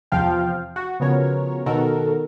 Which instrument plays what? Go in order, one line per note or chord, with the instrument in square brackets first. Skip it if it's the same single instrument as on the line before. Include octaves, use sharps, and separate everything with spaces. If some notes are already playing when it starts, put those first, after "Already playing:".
[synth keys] E2 C3 F3 F5 G5
F#4
C#3 F3 B3 F#4 A#4 C#5
B2 D#3 F#4 A4 A#4